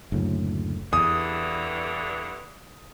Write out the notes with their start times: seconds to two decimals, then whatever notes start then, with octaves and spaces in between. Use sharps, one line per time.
0.12 F#1 D2 A2
0.93 E2 G2 D3 E3 D#6